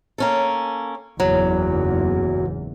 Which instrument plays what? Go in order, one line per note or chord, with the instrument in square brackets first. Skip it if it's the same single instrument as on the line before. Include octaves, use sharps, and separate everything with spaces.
[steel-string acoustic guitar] A#3 C#4 A4
[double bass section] F#1 E2 G#2 [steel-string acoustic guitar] F#3